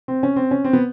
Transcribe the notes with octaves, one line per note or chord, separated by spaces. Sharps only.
C4
C#4
C4
C#4
C4
B3